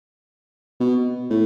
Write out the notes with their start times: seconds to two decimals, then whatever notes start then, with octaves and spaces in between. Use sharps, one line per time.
0.80 B2
1.30 A2